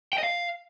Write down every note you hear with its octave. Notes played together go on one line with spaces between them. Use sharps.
G5
D#5
F5